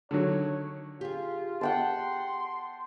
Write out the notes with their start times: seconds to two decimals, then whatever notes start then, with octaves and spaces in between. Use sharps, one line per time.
0.11 D3 D#3 F#3 C#5
1.01 F4 G4 G#4
1.61 F#5 G5 A5 C6